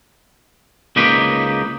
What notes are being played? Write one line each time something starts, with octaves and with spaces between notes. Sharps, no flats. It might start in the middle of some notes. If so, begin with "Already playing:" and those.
C#2 A#3 D#4 G4 B4